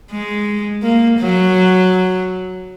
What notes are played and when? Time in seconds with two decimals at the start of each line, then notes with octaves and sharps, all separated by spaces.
0.11 G#3
0.82 A#3
1.19 F#3